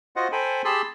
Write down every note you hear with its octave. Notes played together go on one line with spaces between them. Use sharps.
F4 F#4 C5 D#5 F#5
A4 C5 G5 G#5 B5
G4 G#4 A5 B5 C6 E6